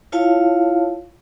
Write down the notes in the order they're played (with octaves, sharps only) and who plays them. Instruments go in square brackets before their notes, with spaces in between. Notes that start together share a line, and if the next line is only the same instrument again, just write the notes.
[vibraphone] E4 F4 C#5 F5 A5